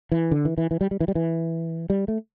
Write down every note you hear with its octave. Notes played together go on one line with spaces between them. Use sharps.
E3
D3
E3
E3
E3
G3
G3
E3
G3
E3
G3
A3